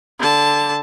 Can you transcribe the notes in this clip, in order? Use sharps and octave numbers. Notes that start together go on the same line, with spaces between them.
D3 A5